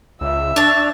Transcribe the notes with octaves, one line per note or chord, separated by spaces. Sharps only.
C#2 E5 E6
D4 C#5 A5